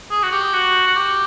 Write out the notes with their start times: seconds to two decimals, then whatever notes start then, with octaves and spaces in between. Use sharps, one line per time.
0.11 G#4
0.23 F#4
0.32 G4
0.53 F#4
0.87 F#4
0.96 G4